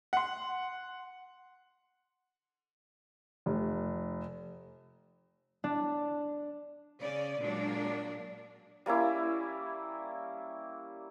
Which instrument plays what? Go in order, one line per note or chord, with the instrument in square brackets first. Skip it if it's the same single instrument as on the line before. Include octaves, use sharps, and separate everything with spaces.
[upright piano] F#5 C6
[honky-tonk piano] F1
[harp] D4
[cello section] C#3 C#4 D5
A#2 F#3 G#3 A#3 D4
[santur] G3 A#3 C#4 E4